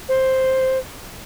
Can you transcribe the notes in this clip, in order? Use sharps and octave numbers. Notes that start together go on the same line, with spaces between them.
C5